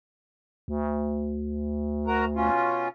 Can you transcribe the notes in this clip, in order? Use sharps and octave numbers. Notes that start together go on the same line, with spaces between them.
D2
F#4 A#4 A#5
B2 C#4 F4